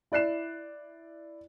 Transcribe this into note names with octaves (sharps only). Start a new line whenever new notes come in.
E4 D5 F#6 C7 E7